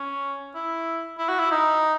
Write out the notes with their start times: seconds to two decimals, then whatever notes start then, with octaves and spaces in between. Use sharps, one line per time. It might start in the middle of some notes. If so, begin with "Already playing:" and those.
Already playing: C#4
0.55 E4
1.18 E4
1.29 F#4
1.40 E4
1.52 D#4